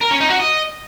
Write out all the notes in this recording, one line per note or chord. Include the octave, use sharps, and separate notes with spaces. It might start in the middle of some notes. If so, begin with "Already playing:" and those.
A#4
C#4
D#4
F#4
D#5